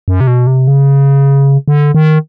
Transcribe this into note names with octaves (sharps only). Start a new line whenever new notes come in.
F#2
C3
B2
C3
C#3
D3
D#3